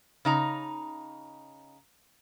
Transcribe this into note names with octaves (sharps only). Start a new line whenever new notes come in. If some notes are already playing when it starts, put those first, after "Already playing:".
C#3 D#4 A#5